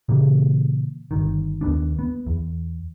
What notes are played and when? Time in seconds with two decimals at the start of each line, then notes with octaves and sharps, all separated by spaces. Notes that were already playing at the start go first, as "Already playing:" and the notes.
0.09 A#2 C#3 E3 A#3
1.11 G1 D#3
1.61 D#2 B3 D4
1.99 B3
2.27 E2